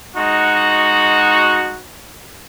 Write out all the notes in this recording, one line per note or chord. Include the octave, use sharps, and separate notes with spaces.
G#3 D#4 F#4